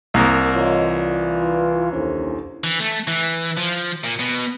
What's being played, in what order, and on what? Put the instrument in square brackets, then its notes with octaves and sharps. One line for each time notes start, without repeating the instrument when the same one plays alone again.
[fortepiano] C2 A#3 [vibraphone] A#4 A#5 D#6
[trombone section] E3 F4 [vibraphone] C#5 D#5
[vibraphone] D5
E4 B4
[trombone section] D#2 C#4 C5 [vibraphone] D4 E4 A4
[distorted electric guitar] E3
A3
E3
F3
A#2
B2